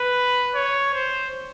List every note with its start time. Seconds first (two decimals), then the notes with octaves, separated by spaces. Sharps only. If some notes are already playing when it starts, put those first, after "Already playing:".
Already playing: B4
0.55 C#5
0.93 C5